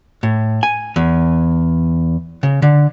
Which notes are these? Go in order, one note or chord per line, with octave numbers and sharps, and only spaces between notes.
A2
G#5
E2
C#3
D3